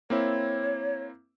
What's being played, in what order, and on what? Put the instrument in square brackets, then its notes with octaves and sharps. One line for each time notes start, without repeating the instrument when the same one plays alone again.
[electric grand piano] A#3 C4 E4 [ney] C#5